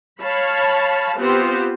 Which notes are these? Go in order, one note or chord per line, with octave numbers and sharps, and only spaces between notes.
C#5 F5 A5 B5
B3 C4 F4 G4 C5